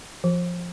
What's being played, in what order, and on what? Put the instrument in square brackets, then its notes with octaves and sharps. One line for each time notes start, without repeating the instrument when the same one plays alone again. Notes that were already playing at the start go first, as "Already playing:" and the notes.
[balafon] F3